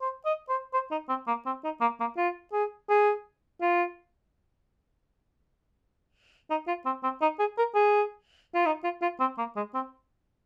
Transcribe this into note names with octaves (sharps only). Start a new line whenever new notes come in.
C5
D#5
C5
C5
D#4
C4
A#3
C4
D#4
A#3
A#3
F4
G#4
G#4
F4
D#4
F4
C4
C4
D#4
G#4
A#4
G#4
F4
D#4
F4
F4
C4
A#3
G#3
C4